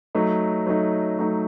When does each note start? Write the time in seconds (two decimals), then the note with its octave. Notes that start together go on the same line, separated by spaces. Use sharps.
0.15 F#3 A3 D#4
0.67 F#3 A3 D#4
1.19 F#3 A3 D#4